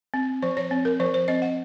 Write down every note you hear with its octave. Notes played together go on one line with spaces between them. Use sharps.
C4
F3 C5
C#5
C4
A#4
F3 C5
C5
C4 D#5
F#5